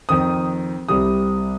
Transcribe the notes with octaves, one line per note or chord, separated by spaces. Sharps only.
F2 D#3 C4 D#6
C2 C3 G3 C4 D#6